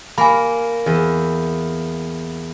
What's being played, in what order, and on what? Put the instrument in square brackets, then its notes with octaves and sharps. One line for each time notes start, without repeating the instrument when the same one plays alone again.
[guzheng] A#3 [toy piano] G#5 B5
[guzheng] E2